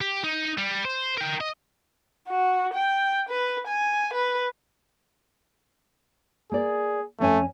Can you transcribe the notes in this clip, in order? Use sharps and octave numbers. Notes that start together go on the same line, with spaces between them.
G4
D#4
G3
C5
A#4 G5
D#5
F#4
G5
B4
G#5
B4
A#3 G#4 D5
F2 A3 C#4 G#5